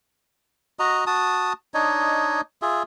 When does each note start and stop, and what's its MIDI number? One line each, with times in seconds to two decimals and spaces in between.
0.79 1.04 66
0.79 1.04 75
0.79 1.04 82
1.07 1.53 66
1.07 1.53 81
1.07 1.53 87
1.74 2.41 62
1.74 2.41 63
1.74 2.41 73
1.74 2.41 75
2.62 2.83 65
2.62 2.83 68
2.62 2.83 76